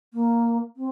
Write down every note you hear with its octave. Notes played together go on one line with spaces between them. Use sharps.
A#3
C4